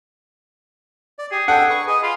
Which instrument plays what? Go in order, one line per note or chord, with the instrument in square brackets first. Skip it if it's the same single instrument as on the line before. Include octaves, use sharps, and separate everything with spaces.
[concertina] D5
[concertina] G4 [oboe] G#4
[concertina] D4 A4 G5 [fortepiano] F#5
[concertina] B4 C#6
[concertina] G#4 B4 [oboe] D#5
[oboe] F4 [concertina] B4 B5